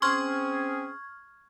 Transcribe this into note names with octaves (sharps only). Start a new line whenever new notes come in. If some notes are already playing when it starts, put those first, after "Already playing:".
C4 C#4 G#4 C6 C#6 F6 G#6